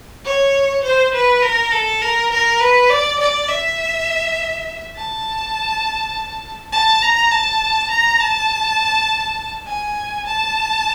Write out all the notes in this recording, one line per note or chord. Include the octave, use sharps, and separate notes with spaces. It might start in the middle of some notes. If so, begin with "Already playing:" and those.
C#5
C5
B4
A#4
A4
A#4
A#4
B4
D5
D5
E5
A5
A5
A#5
A5
A#5
A5
G#5
A5